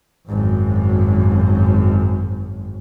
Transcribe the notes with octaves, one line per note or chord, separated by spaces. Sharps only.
G#1 F#2